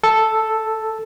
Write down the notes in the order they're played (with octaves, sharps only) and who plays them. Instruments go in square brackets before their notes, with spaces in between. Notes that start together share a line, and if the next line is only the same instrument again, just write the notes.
[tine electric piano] A4